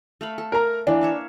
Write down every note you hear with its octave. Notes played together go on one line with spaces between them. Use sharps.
A3 F5 B5
A4
A#4 A#5
E3 A#3 D4
C#5 E5 F5